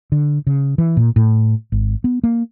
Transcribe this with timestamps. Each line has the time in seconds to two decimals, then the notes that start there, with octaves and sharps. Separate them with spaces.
0.12 D3
0.47 C#3
0.78 E3
0.97 A#2
1.16 A2
1.72 G#1
2.04 B3
2.24 A#3